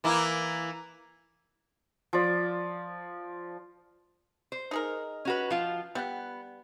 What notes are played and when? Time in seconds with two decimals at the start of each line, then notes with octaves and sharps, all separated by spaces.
0.04 E3 A#3 E4
2.13 F3 D5
4.52 C5
4.71 D#4 G#4 A#4
5.25 C#4 F#4 B4
5.50 F3 F4
5.95 G3 B3 F#5